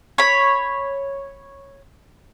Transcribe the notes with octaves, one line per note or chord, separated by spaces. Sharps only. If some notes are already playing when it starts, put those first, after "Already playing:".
C#5 B5